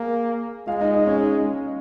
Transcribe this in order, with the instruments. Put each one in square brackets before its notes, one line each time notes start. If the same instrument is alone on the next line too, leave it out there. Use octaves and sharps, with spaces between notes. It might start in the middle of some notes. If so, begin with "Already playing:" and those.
Already playing: [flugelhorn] A#3 [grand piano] G#4 G#5
[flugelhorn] G#3 [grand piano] F4 F5
[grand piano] D#4 D#5
D#4 D#5
C#4 C#5
D#4 D#5